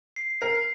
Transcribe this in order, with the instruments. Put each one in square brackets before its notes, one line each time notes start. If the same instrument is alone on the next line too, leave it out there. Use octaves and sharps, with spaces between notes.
[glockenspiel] C7
[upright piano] A#4 [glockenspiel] C7